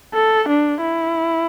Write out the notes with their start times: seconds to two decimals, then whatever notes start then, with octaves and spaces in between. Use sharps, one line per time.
0.14 A4
0.49 D4
0.81 E4